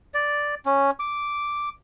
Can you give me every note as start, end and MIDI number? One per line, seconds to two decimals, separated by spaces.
0.14 0.55 74
0.66 0.91 61
1.00 1.69 86